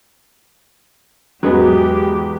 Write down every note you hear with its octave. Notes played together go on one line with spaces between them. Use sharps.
E2 G#2 F#3 G#3 B3 G4